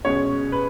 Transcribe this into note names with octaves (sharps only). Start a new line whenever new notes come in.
B2 G#3 C#4 C#5
B4